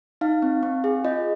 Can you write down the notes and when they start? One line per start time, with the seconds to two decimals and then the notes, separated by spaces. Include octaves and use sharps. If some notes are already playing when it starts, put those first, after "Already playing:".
0.21 D#4 F5
0.42 C4
0.63 C4
0.84 G#4
1.04 F4 D#5